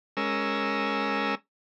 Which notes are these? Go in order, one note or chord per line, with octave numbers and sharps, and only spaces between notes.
G#3 C#4 A#4 E6